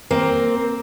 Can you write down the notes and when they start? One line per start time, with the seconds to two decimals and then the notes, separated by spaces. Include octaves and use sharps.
0.11 A#3 C4